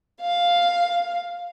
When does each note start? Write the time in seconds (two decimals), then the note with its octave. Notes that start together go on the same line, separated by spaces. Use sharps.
0.20 F5